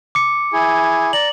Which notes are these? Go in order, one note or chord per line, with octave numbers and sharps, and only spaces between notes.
D6 C#7
E4 G#4
D5 A#5 F#7